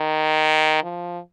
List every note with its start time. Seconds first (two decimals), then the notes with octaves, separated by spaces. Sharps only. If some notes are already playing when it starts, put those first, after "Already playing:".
Already playing: D#3
0.83 F3